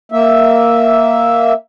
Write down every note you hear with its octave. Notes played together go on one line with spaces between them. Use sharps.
A#3 E5